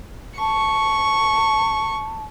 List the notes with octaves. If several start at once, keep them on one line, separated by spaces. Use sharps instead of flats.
A5 C#6